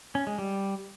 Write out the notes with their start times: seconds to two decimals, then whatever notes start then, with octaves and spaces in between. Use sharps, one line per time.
0.15 C#4
0.27 G#3
0.39 G3